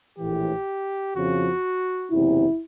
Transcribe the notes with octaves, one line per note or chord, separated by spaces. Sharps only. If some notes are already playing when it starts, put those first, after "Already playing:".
A#1 A2 E3 G4
F2 C#3 F3 F#4
F#1 E2 C3 E4